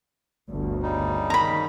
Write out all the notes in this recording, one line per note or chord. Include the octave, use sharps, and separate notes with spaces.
G1 D2
C#3 G3 D#4
D#3 A#5 B5